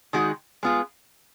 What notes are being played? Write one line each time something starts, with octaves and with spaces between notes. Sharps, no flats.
D#3 G#3 D#4 F#4
G#3 B3 F4 G#4